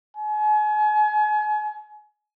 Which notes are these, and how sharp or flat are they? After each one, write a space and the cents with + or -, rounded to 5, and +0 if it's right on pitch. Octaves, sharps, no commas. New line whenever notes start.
G#5 +35